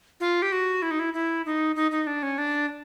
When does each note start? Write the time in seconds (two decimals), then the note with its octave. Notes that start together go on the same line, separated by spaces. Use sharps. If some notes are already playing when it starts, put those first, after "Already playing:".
0.20 F4
0.42 G4
0.52 F#4
0.82 E4
0.91 D#4
0.99 E4
1.14 E4
1.46 D#4
1.76 D#4
1.91 D#4
2.07 D4
2.23 C#4
2.38 D4